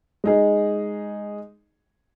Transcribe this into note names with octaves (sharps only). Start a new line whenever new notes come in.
G#3 D#4 G#4